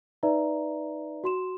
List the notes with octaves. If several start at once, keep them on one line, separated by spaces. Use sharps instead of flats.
D#4 B4 D5 E5 A#5
F#4 C6 E7